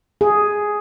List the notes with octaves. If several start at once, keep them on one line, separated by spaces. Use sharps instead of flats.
G#4